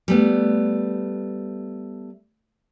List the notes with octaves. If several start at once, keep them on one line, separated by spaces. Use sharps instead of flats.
G3 A3 B3